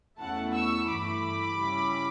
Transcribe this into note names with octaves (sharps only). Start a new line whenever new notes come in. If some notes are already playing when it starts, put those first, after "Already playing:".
E2 B2 A3 C#4 E4 F#5 A5
C#6 E6
G2 E3 A3 E4 B5 D6
C#3 G3 C#4 E4